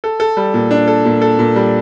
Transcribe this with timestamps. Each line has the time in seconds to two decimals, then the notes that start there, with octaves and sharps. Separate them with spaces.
0.04 A4
0.20 A4
0.37 G3
0.54 A#2
0.71 D4
0.87 A4
1.05 A#2
1.21 A4
1.39 A#2
1.56 G3